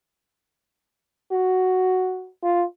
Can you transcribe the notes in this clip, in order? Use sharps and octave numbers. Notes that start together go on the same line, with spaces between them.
F#4
F4